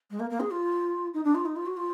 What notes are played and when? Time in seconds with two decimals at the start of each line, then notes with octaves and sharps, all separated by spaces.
0.10 G#3
0.19 A#3
0.30 A#3
0.40 G#4
0.51 F4
1.14 D#4
1.24 D4
1.35 F4
1.45 D#4
1.56 F4
1.66 F#4
1.77 F4